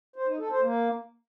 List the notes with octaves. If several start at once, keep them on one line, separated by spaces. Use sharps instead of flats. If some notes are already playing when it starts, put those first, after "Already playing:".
C5
D#4
A4
C5
A#3